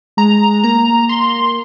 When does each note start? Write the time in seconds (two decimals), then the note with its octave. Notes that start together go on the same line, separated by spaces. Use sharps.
0.17 G#3 A#5
0.64 A#3 A#5
1.09 C6